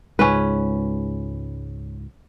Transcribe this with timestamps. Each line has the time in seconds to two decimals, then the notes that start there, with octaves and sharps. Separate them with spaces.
0.19 C#2 G#2 C#4 B4